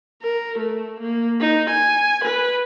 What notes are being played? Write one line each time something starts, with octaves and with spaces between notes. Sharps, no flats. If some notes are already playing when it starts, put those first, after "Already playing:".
A#4
A3
A#3
D#4
G#5
B4